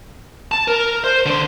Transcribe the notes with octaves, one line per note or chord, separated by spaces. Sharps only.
A5
A#4
C5
D3 C6